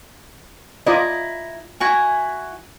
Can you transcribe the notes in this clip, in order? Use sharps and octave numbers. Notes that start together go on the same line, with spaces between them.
E4 F4 D5 D#5 A#5
E4 F#4 G#5